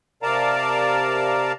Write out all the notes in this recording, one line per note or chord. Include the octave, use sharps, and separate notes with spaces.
C3 A#4 D5 F5 A5 A#5